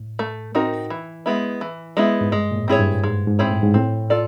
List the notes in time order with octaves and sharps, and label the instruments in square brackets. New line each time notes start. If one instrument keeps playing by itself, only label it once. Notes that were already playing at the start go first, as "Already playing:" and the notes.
Already playing: [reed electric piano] A2
[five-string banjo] A3
C4 D#4 F#4 A#4
E3
G#3 B3 E4
E3
G#3 B3 E4
[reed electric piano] G#2
[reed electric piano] G2 [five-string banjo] G#3
[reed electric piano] A#2
A2
[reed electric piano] G#2 [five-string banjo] C4 E4 G#4 C#5
[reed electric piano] G2
[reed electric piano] G#2 [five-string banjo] G#3
[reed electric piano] G#2
[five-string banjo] C4 E4 G#4 C#5
[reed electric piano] A2
G#2
[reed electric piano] A2 [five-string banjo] C4
[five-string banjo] F4 A4 D5